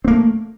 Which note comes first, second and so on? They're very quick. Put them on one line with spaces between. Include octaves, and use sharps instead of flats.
C4 A#3 A3